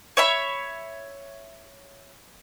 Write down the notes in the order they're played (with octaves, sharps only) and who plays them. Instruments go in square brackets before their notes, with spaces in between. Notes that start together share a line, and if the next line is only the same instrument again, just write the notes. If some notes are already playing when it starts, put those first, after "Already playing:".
[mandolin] C#5 E5 B5